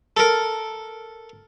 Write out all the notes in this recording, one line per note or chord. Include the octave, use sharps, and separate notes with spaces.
A4 A#4